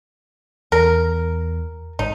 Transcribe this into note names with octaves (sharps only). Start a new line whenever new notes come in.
E2 A#4
G#1 D#4